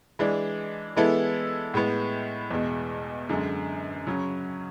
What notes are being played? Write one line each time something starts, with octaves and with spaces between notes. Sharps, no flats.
E3 G#3 D4
E3 G#3 B3 E4 A4
A2 G#3 B3
E2 B2 G#3
F#2 D3 G#3
C#3 F#3 C#4